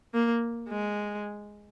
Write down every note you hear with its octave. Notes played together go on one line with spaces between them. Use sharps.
A#3
G#3